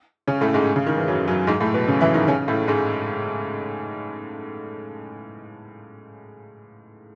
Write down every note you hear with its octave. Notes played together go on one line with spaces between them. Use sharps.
C#3 C#4
A2 A3
G#2 G#3
C#3
D#3
E3
F#2 F#3
F#2 F#3
G#2 G#3
A2 A3
B2 B3
C#3 C#4
E3 E4
D#3 D#4
C#3 C#4
A2 A3
G#2 G#3